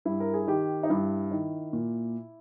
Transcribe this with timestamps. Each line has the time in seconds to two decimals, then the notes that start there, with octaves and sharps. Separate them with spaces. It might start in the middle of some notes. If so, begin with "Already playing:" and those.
0.05 G2 E4
0.20 A#4
0.34 G#4
0.47 D#3 G4
0.83 D#4
0.89 G2 E4
1.31 D#3
1.73 A#2